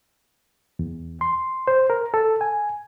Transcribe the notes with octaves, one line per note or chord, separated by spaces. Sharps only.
E2
C6
C5
A#4
A4
G#5